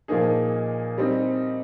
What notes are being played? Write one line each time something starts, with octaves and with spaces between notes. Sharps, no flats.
A#2 F3 A#3 D#4 G#4
G3 C4 D#4